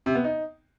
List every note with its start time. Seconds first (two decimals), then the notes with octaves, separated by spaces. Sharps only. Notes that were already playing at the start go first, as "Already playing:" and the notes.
0.06 C3
0.15 B3
0.24 D#4